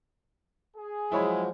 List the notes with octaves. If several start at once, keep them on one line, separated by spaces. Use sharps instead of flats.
G#4
F3 F#3 G#3 E4 C#5 B5